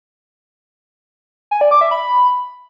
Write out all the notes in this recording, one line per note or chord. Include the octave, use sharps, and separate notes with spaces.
G#5
D5
D6
E5
B5